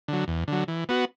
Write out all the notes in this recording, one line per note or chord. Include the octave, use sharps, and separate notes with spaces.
D3 F#3
E2
D3 F#3
E3
B3 F#4